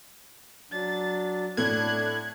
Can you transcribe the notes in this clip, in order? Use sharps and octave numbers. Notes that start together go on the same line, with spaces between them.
F#3 D4 A6
A2 A3 D4 F#6 G#6